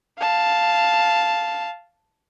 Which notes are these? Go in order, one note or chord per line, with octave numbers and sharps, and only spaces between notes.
F5 A5